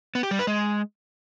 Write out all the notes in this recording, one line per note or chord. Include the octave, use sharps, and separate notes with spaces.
B3
G4
G3
B4
G#3